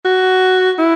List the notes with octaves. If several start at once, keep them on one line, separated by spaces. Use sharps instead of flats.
F#4
E4